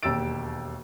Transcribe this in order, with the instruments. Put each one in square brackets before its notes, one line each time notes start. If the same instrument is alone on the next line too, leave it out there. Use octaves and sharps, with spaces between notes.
[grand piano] E1 D#2 G4 E6 A6 D7